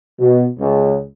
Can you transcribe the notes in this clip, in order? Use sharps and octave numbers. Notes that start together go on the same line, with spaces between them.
B2
C#2